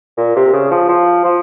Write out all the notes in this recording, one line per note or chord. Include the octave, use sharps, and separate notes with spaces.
A#2
C3
C#3
F3
F3
F3